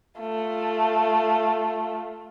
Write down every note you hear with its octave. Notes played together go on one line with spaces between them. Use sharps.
A3 F4